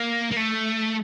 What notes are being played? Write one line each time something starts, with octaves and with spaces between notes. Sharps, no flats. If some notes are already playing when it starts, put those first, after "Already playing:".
Already playing: A#3
A#3
A3